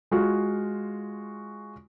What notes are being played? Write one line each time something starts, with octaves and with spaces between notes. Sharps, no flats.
G#3 F4 F#4